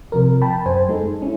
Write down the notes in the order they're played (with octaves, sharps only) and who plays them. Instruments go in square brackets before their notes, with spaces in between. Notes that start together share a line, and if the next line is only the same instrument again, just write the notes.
[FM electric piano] C3 F3 A#4
G5 A5 B5
F#2 C5 G#5
G#3 D#4 A4
C#4 E4